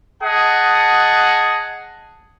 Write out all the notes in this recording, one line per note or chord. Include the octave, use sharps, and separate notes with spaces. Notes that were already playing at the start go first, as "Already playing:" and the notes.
G#4 D#5 F#5 A5